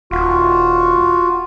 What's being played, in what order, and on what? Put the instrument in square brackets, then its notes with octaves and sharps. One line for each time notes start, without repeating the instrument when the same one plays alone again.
[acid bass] D#1 [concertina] F4 F#4